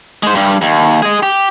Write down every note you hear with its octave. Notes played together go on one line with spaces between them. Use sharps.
G#3 C5
G2 G3
D#2
G#4 D#5
G4